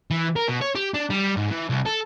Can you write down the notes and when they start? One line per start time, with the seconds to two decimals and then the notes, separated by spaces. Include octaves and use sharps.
0.11 E3
0.36 A#4
0.48 B2
0.61 C#5
0.75 G4
0.94 D4
1.10 G3
1.36 G#2
1.50 E3
1.70 C2
1.86 A4